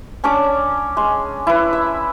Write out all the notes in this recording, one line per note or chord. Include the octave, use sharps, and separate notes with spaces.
C#4 D4 C#5 D6
G#3
E4 B4
E5